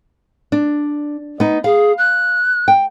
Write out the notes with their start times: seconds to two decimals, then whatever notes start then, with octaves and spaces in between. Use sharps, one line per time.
0.52 D4
1.40 B3 D#4
1.64 G#4 F5
1.98 F#6
2.68 G5